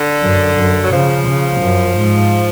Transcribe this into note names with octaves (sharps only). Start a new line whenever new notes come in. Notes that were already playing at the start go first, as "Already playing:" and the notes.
Already playing: D3
F#2
F#2
F#3
C#3 F3
C#3
F#2
G#2